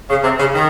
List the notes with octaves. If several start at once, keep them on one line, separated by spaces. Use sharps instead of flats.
C#3
C3
C#3
D#3